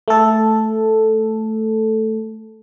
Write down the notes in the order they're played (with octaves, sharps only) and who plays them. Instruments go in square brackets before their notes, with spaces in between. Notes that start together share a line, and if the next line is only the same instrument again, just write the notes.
[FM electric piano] A3 A4